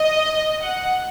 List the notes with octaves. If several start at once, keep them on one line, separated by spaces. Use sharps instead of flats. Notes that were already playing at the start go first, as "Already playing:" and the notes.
Already playing: D#5
F#5